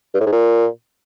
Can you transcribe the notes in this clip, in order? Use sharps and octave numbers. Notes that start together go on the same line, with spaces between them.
G2
A2
G#2
A#2